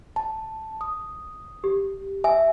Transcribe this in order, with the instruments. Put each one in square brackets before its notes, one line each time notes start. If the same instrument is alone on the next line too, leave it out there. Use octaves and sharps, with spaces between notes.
[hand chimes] A5
D#6
[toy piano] G4
[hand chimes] E5 [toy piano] G#5